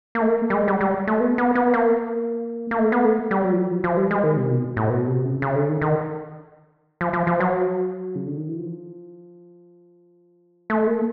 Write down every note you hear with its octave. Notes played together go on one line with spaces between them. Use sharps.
A#3
A3
A#3
G3
G#3
G3
G3
A3
B3
B3
B3
A#3
A#3
A3
B3
A3
G3
F#3
F3
F#3
F3
F3
G3
G#3
D#3
C3
B2
A2
B2
C3
C#3
C#3
D3
D#3
D#3
F3
F3
F3
F#3
C#3
D3
D#3
E3
F3
A3
A#3